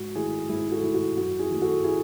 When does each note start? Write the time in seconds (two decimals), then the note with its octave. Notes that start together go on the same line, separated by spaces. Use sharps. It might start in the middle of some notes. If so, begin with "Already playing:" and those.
Already playing: G#2 F#4
0.15 D#3 A3 E4 G#4
0.49 G#2 E4 G#4
0.71 F#4 A4
0.82 D#3 A3 E4
0.94 F#4
1.17 F#2 F#4
1.39 E4 G#4
1.50 D#3 F#3 A3
1.61 F#4 A4
1.84 E4 G#4